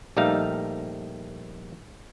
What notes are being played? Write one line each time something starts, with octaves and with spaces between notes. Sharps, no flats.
A#1 G3 A3 D#4 F5